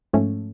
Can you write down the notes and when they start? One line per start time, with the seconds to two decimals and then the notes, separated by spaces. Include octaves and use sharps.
0.13 G#2 F3 A3 C#4